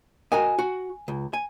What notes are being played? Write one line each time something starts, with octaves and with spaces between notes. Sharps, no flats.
F#4 A#4 D#5 G#5
F#4
C#2
G#5